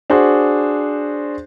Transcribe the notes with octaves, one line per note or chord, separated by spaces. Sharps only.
D4 F#4 G#4 C5